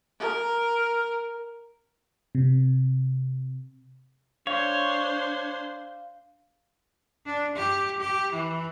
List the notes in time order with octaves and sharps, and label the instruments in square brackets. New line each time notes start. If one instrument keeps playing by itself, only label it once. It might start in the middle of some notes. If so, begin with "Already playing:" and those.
[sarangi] A#4
[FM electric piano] C3
[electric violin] D4 C5 [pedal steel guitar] C#5 [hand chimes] F5
[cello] D4
G4
G4
E3